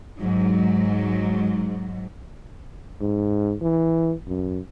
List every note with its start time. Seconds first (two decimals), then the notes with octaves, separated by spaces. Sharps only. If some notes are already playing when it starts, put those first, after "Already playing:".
0.19 G#2 F#3
3.01 G#2
3.61 E3
4.27 F#2